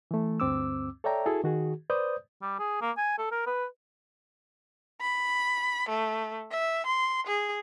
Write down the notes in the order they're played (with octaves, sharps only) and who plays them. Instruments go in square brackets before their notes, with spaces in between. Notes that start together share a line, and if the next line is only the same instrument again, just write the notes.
[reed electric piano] E3 A3
D2 G2 C4 D6 E6
A4 C#5 D5 E5 G5 A#5
E4 F#4 G#4 A4
D#3 F#4 G#4
B4 C5 D5 D#6 G6
[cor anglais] G3
G#4
A#3
G#5
A4
A#4
B4
[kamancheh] B5
A3
E5
C6
G#4